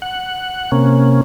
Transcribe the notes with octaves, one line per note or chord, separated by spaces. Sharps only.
F#5
C3 A#3 C#4